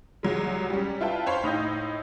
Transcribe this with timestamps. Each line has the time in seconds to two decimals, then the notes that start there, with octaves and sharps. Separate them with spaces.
0.23 C2 F#3 G#3
0.70 G3 C#4
1.01 E4 F4 B4 G5 A5
1.26 C5 C#5 F5 G5 B5 C6
1.44 A2 D#4 D#5 G6